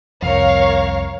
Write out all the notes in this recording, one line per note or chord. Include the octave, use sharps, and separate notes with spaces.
C2 F2 A#4 C#5 F5